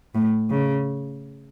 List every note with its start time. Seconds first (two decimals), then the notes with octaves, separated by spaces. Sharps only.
0.14 A2
0.50 C#3